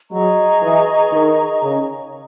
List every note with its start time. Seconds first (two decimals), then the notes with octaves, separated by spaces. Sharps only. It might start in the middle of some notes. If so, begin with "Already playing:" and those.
0.11 F#3 G#4 D#5 A#5 C#6
0.62 E3
1.12 D#3
1.63 C#3